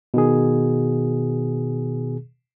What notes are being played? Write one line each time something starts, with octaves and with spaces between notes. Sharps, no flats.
B2 D#3 G#4